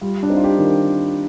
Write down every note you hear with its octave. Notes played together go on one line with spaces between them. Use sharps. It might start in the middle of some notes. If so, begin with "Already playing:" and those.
G3 F4
D4
C4 D#4
F4
G4
D#3